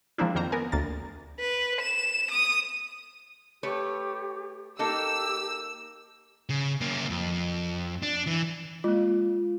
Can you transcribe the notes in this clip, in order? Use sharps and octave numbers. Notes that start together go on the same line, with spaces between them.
F3 G#3 A#3 C4 D4 E4
F2 D#3 A#3 C5 A#5
B3 A#4 G#5
D2 A#3 A6
B4
E7
D#6
A3 G4 B4 C#5
A#3 D#4 G4 A4 E6
C#3
A#3 C#4
F2
D4
E3
G#3 A#3 F4